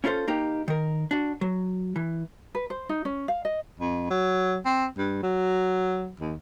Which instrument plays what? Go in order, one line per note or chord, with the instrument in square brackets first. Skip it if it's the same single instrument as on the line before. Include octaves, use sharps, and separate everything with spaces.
[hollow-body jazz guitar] C#4 E4 F4 A4 C5
A#3 D#4 G4
D#3 A#4
D4 F#4
F#3
E3
[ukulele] B4
C5
D#4
C#4
F5
D#5
[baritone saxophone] F2
F#3
C4
G2
F#3
D#2